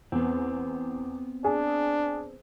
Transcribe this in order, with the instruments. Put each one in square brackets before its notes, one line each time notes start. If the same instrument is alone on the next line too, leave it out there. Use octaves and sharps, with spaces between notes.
[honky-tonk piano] E2 [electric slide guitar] B3 C4
[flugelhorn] D4 [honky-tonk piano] G#4